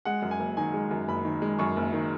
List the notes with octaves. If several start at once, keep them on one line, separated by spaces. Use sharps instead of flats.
G#3 F#5
F#2
G#5
F#1
D#3 G#5
G#3
F#2
F#1 B5
D#3
G#3
F#2 C#6
F#1
D#3